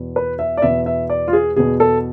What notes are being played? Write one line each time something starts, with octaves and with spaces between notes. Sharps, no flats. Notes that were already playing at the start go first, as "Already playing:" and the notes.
Already playing: E2 B2
B4
E5
D5
E2 B2 E5
E5
D5
F4
G#4
E2 B2 G#4
A4